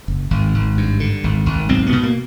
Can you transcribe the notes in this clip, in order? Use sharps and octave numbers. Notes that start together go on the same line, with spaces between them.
F#1
G#1
G#1
G2
D3
G#1
G#1
B1 C4
B3
B2
A#3